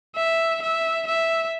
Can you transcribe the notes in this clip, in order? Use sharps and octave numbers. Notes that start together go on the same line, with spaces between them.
E5
E5
E5